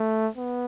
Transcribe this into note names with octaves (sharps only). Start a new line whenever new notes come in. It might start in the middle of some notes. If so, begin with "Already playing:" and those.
Already playing: A3
B3